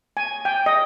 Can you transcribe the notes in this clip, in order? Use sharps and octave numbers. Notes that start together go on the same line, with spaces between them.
G#5
G5
D#5